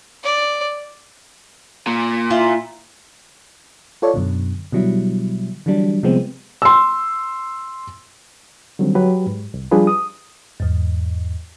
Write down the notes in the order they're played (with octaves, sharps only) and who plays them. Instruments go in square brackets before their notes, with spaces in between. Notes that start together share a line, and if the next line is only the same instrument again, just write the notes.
[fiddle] D5
[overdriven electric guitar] A#2
[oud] E4 F4
[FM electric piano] F4 A4 C#5 D5
F#2 B2 D3
B2 D3 F#3 G3 E4
D3 E3 F#3 G3 D4
C3 F3 G3 G#3 B3 C4
[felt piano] C6 E6
[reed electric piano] D3 D#3 F#3 G3 C4
F#3 G4 B4
G#2
C2
F3 G3 D4 F4 G#4 B4
D#6
[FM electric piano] E2 G#2